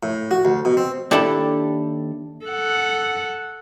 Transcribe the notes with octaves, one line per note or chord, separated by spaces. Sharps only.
A2
F#4
D2
B2
C4
D#2 D4 E4 G4 A4
A4 F#5